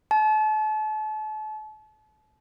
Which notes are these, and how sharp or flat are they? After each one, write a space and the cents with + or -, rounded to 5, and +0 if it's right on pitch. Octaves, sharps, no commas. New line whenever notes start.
A5 -35